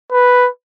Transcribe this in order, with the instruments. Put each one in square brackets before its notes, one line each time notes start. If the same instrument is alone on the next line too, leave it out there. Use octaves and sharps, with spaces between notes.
[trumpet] B4